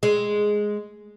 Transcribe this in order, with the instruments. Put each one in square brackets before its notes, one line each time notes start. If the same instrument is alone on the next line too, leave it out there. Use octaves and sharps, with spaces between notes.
[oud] G#3